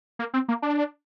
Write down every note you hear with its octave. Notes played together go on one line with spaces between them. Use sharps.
A#3
C4
A#3
D4